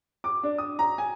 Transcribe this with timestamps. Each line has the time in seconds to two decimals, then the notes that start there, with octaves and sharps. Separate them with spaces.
0.24 D6
0.43 D4
0.58 D#6
0.79 A#5
0.98 G#5